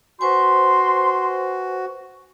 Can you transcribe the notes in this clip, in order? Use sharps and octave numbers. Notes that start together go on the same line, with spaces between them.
F#4 B4 C5 G#5 C6